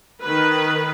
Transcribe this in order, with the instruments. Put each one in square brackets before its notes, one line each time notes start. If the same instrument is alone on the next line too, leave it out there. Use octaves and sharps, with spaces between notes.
[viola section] D#3 B4